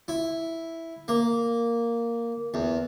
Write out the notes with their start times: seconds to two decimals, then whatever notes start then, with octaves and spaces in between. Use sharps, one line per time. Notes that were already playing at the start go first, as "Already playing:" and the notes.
0.08 E4
1.08 A#3
2.54 E2